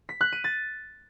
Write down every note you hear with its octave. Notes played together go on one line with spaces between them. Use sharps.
B6
F#6
D#7
A6